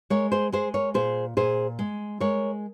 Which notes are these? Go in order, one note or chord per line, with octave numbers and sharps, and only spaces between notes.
G#3 A#4 C#5
G#4 C5
G#3 G#4 C5
A#4 C#5
A#2 G#4 C5
A#2 G#4 C5
G#3
G#3 A#4 C#5